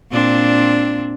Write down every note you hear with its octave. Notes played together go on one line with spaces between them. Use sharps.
A#2 C4 D4